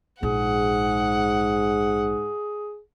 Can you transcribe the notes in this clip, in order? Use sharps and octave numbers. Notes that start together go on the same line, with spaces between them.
A#1 G#2 G#4 F#5